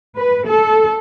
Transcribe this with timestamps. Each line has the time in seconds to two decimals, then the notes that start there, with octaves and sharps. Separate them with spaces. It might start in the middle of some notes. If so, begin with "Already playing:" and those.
0.16 B4
0.46 A4